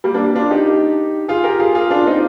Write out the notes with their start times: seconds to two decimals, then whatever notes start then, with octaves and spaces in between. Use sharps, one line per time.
0.04 G3 A#3
0.14 A#3 D4
0.35 D4 F4
0.51 D#4 G4
1.28 F4 G#4
1.44 G4 A#4
1.60 F4 G#4
1.75 F4 G#4
1.90 D4 F4
2.07 C4 D#4